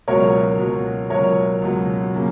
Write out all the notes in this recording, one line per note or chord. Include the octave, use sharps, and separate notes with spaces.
C#2 B2 F#3 A#4 C#5
C#2 B2 F#3
C#2 B2 F#3 A#4 C#5
C#2 B2 F#3
C#3 F#3 A#3